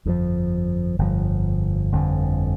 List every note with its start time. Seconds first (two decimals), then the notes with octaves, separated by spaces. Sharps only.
0.05 G1 F2 D3 F3
0.99 G1 F2 D3 F3
1.92 G1 F2 D3 F3